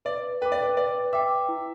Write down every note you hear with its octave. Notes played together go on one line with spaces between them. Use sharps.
B4 D5
B4 G5 D6
D5
B4
B4 D5
E5 G5 D6
E4